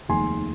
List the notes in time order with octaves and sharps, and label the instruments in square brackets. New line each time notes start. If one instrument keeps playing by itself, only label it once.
[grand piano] F1 D#2 D#3 G#3 G#5 C6